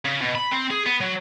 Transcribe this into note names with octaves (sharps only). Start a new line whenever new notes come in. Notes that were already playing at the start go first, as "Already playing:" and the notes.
C#3
B2
B5
C4
G#4
B3
F#3